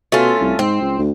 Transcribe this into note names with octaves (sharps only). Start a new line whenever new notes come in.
B2 A3 C#4 F4
C2
G#2 C4
C#2
D2